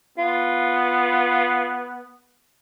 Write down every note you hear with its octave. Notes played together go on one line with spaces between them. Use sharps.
B3 F4